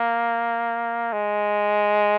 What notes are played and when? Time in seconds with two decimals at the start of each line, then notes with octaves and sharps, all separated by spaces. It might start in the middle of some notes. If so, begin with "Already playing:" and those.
Already playing: A#3
1.12 G#3